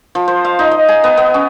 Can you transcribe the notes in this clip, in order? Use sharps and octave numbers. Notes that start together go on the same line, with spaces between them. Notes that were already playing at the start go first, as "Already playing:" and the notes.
F3
C5
F5
D#4
D#5
G#5
B3
B3
C#4